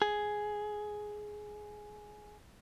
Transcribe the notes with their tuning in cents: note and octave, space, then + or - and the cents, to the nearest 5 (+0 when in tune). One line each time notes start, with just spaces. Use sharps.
G#4 +10